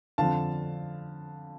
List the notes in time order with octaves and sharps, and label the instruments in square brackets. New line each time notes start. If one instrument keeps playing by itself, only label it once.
[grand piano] F2 D3 F5 A5